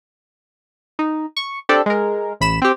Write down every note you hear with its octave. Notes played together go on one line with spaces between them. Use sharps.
D#4
C#6
C4 D4 G4 A4 D5
G#3 A#4
A1 B5 E7
C4 G4